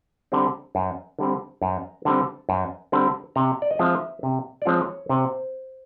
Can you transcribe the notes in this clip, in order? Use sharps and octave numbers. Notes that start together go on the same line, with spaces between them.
D3 G3 C4
F#2
D3 G3 C4
F#2 A#5
D3 G3 C4 A5
F#2
D3 G3 C4
C3 A#5
D5
D#5
F3 G#3 C4 F4 E5
C3
D5
F3 G#3 C4 F4 C#5
C3 C5